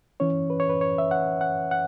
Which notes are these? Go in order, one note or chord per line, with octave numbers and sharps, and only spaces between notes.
E3 C#4 C#5
B4
C#5
B4
C#5
E5
F#5
F#5
F#5